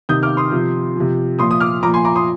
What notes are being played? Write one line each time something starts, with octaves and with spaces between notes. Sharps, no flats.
C3 D#3 D#6 G6
D6 F6
C6 D#6
C3 F3
C3 F3
A#2 F3 C6 D#6
D#6
D6 F6
A#2 F3 A#5 D6
G#5 C6
A#5 D6
C6 D#6